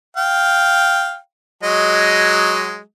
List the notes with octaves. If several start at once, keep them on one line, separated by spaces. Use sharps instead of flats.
F5 G5
F#3 G#3 D#5